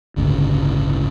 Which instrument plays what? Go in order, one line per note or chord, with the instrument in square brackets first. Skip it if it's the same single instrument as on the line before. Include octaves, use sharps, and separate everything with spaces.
[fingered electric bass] G1 D2 A2 C#3